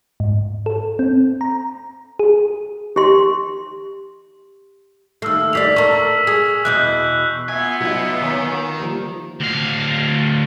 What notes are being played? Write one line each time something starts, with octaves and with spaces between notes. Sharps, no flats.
G#2
A4
C4
A#5
G#4
G4 C6
D#2 A3 E6 F6 C7
D#2 G4 D5 B6 C7 F7
A4 A#4 C#6 F#7
G#4 C7
E2 B2 E3 F#6 G6
B3 F4 E5 G#5
B2 F#3 D#4 D#5
D#3 C#5 G#5 A#5
F3 G3 A#3
D2 F5